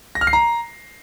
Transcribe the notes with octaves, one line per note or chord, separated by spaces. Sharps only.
A#6
F6
C7
A#5